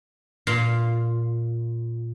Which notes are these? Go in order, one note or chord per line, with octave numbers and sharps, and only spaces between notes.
A#2 F4